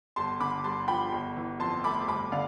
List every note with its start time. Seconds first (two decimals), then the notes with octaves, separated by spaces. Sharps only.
0.16 G1 A5 C6
0.40 D3 B5 D6
0.64 G2 A5 C6
0.88 F3 G5 B5
1.12 G1
1.37 E3
1.60 F2 A5 C6
1.84 A3 B5 D6
2.08 G1 B5 D6
2.32 D3 D5 F5